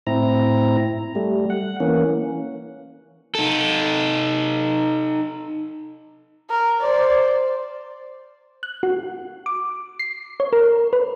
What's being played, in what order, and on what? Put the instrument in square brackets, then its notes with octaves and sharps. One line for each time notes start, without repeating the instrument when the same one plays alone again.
[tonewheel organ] A2 C4 E4 A#5
G3 A3
F#5
E3 A#3 C#4
[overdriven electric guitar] D#4 A4
[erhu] A#4
[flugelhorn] C5 [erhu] D5
[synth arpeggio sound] F#6
F#4
D6
C7
C#5
A#4
B4